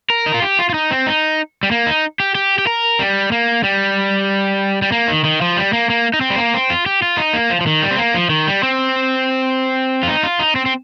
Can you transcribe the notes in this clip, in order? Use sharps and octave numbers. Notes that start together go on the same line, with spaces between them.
A#4
D#4
F4
G4
F4
F4
D#4
C4
D#4
G3
A#3
D#4
G4
G4
G4
A#4
G3
A#3
G3
G3
A#3
D#3
D#3
F3
G3
A#3
A#3
D#4
C4
G3
A#3
C4
F4
G4
F4
D#4
A#3
F3
F3
D#3
G3
C4
A#3
F3
D#3
G3
C4
F4
D#4
F4
D#4
C4
C4